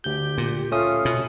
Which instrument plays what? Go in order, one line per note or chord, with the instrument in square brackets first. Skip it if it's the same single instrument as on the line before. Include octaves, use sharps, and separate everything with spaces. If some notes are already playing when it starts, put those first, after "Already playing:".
[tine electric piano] D2 G6 [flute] G4
[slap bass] A#2
[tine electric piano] A3 C#4 D#6 [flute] F4
[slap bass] B2